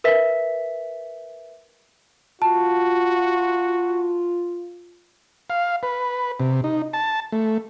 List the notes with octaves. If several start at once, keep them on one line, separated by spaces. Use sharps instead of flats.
A#4 B4 E5 B6
F4 F#4 A5
F5
B4
C3
D#4
A5
A3